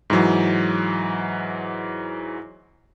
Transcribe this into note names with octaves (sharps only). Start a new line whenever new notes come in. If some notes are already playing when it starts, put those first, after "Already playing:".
G#2 E3 F#3